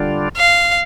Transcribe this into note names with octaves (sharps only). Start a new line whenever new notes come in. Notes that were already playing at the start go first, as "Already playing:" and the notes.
Already playing: D3 G3 D4 F4
F5